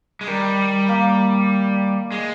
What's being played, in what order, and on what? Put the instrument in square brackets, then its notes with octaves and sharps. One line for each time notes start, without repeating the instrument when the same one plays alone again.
[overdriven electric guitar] G#3
[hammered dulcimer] D#3 [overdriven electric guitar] G3
[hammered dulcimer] A#3
[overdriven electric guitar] G#3